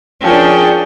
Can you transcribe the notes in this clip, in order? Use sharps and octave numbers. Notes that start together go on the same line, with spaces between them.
F3 C#4 D4 G#4 A#4 G5